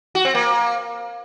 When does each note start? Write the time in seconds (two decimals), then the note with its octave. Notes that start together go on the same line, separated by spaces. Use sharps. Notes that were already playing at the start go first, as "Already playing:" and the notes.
0.15 F#4
0.25 C4
0.35 A#3